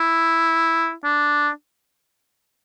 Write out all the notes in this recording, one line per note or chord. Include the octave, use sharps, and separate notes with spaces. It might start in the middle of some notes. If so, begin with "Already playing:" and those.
Already playing: E4
D4